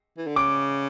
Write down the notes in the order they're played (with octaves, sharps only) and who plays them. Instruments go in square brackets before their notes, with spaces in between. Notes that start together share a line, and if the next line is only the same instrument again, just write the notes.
[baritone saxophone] E3
D3
[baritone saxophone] C#3 [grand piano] D6